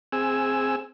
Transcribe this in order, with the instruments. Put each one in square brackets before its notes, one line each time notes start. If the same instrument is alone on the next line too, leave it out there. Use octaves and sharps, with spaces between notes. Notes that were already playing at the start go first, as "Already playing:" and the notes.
[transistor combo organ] C4 G#4 G#5 E6